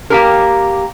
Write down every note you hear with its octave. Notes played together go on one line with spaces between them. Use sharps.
A#3 G4 A#4